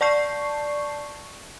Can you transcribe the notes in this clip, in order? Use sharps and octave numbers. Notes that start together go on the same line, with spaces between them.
D5 A5 C#6 G6 C7